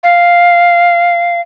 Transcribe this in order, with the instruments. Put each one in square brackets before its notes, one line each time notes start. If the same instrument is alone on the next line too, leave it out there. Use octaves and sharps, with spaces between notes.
[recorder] F5